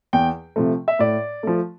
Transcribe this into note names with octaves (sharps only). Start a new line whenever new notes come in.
E2 G5
C3 F3 A3
E5
A2 D5
F3 A3